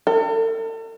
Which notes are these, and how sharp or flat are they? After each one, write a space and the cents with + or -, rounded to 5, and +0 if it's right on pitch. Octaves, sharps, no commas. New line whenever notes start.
A4 +40